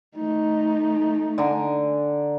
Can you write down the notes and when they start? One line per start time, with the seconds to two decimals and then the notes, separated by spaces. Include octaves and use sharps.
0.15 A3 D#4
1.38 D3 G#5 A#5